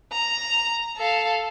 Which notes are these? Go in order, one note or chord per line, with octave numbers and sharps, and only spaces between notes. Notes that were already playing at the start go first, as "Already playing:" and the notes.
A#5
A4 F5